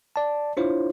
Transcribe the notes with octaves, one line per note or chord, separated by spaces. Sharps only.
D5 A5
D4 E4 F4 C5 C#5